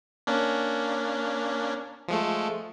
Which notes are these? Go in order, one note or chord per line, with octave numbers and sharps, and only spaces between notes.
A#3 C#4 D4
F3 G#3 A3